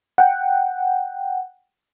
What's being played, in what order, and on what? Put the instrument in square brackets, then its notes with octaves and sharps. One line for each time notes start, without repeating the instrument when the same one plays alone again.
[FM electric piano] F#5 G5